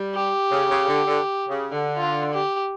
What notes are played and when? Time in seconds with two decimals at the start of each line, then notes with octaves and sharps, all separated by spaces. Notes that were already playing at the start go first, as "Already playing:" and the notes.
Already playing: G3
0.14 G4
0.51 C#3
0.69 C#3
0.87 D3
1.06 D3
1.49 C#3
1.72 D3
1.97 F4
2.34 G4